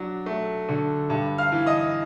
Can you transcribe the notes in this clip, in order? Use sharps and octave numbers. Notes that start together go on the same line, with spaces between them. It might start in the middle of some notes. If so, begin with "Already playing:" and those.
Already playing: F#3 D4
A3
D3
G2
F5 F6
E3
D#5 D#6